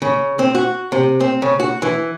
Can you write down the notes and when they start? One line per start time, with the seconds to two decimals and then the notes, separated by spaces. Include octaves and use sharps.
0.02 C#3
0.39 C4
0.55 F#4
0.92 C3
1.21 C4
1.42 C#3
1.60 F#4
1.82 E3